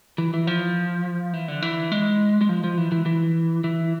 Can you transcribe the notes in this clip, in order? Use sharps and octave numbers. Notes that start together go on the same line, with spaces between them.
E3
E3
F3
E3
D3
E3
G#3
G#3
F3
F3
E3
E3
E3
E3